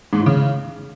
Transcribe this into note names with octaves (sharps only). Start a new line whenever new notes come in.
G#2
A2
C#3